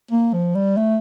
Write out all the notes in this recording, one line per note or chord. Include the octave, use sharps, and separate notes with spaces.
A#3
F3
G3
A3